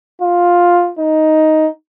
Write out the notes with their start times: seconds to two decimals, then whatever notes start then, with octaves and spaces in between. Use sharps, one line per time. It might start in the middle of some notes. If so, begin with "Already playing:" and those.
0.22 F4
0.99 D#4